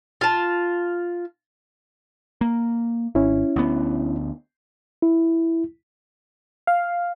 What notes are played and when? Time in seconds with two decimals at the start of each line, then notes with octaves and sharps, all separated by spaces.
0.21 F4 A5
2.41 A#3
3.15 G#1 C#4 E4
3.56 D2 B3
5.02 E4
6.67 F5